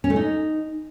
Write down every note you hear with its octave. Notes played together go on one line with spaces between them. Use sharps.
C#4
A3
D#4